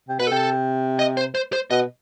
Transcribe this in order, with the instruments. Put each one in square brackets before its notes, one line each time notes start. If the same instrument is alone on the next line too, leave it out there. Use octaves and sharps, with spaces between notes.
[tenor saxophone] C3
[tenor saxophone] B2 [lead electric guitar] B4
[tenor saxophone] C3 [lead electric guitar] A4
[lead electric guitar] D#5
C5
C5
C5
[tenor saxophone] B2 [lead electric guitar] D#5